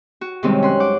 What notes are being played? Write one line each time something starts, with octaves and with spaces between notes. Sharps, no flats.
F#4
F#2 C3 D#3 G3 G#3 C4
C#4 C6 F#6
C5 F#5 D6